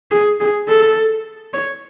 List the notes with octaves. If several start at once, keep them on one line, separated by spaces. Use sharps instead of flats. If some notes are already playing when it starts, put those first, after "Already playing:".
G#4
G#4
A4
C#5